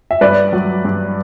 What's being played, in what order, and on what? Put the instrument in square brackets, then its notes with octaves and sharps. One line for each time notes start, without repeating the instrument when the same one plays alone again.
[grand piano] E5
G2 B4 D5
F#3
G2